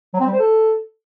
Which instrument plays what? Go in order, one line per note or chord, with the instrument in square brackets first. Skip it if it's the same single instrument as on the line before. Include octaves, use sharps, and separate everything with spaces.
[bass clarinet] F#3
C4
G3
C5
A4